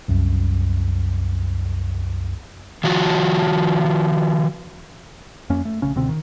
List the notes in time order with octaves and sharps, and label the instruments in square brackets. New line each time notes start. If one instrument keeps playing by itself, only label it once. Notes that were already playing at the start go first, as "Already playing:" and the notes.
[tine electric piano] C2 F#2
[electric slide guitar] D#3 F3 F#4
[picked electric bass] F2 A#3 C#4
A3
A#1 C#3 C#4
C#2 B2 D3 C4
D#3